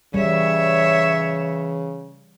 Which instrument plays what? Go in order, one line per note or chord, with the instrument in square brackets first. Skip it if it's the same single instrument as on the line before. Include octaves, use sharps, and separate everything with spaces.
[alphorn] C#3 [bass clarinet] E3 [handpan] G3 [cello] C#5 E5